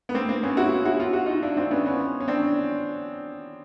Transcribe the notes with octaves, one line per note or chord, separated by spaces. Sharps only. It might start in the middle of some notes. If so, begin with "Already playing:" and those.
B3
A#3 C4
A#3 C4
B3 C#4
E4 F#4
E4 F#4
F4
F#4
D#4 F4
D4 E4
C4 D4
B3 C#4
B3 C#4
C#4
C4 D4